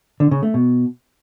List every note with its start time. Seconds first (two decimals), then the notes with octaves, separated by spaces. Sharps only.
0.20 D3
0.31 C#3
0.43 A3
0.54 B2